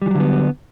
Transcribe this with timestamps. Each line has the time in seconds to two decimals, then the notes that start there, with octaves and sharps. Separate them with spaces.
0.02 G3
0.06 E3
0.11 F#3
0.15 D3
0.20 B3